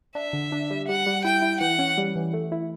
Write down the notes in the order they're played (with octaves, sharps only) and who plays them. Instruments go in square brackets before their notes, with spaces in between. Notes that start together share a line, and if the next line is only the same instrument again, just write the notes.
[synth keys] D4 [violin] E5
[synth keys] D3
D4
G3
[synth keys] G3 [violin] F#5
[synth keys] G3
[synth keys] E4 [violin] G5
[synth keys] E4
[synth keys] E3 [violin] F#5
[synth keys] C#4
G3
E3
A3
E4